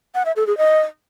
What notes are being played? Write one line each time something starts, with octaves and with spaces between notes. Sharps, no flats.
F#5
E5
A4
G#4
D#5